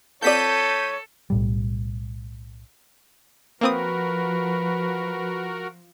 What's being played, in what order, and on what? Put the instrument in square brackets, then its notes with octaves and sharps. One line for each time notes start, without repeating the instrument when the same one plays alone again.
[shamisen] F3 C4 D5 [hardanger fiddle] A4 [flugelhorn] C#5 [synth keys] G6 B6 D#7
[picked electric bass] B1 A2 G3
[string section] F3 [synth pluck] A#3 C4 D#6 [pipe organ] F#4 A#4 [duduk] B4